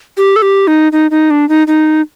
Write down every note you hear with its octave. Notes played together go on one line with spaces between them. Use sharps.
G4
A4
G4
D#4
D#4
D#4
D4
D#4
D#4